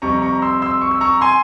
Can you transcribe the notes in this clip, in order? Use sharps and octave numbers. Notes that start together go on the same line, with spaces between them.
F2 C3 G3 A#5 C#6
A#5 C#6
C6 E6
C6 E6
C#6
E6
A#5 C#6
G#5 C6